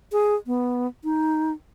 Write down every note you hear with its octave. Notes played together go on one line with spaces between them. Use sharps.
G#4
B3
D#4